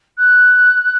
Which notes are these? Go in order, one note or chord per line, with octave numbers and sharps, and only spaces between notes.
F#6